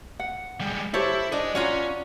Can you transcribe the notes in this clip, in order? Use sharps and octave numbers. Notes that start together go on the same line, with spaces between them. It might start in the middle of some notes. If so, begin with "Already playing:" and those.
F#5
G3 G#3
E4 G4 A4 C5 C#5
D4 G#4 D#5
C#4 F4 F#4 C#5 F5 A#5